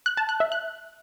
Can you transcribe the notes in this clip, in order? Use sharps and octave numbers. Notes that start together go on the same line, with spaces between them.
F#6
A5
F#6
E5
F#6